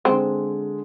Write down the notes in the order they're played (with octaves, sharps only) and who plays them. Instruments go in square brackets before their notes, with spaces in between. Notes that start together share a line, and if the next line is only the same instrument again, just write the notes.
[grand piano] D3 G#3 [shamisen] C4